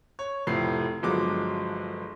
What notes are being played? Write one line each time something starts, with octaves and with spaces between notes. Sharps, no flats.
C#5
F1 A2 F3 C7
G1 F3 F#3 G#3 D6